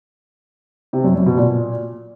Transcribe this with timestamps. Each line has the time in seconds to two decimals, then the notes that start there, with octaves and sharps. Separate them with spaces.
0.93 C3
1.04 F#2
1.15 F#2
1.26 B2
1.37 A#2